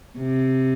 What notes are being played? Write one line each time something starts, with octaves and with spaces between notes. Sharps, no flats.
C3